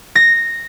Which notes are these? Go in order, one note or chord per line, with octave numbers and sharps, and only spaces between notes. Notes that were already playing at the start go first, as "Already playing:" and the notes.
A#6